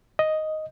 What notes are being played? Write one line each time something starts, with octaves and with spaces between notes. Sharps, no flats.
D#5